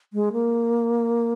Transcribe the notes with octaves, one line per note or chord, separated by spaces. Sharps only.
G#3
A#3